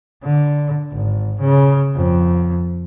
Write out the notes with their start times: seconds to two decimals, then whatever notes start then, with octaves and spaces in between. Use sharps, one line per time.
0.23 D3
0.92 G#1
1.41 C#3
1.96 F2